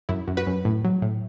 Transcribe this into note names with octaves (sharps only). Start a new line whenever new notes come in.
F#2 E4
F#2
F#4 B4
F#2
A2
F#3
A2